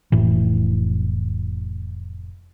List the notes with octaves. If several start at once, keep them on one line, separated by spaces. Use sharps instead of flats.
F1 A2 E3